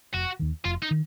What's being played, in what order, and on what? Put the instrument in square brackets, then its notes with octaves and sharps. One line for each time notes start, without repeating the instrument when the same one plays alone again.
[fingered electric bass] F1 [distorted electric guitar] F#4
[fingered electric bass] D#2 D#3
[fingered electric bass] F1 [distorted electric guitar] F4
[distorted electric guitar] D#4
[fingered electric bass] D#3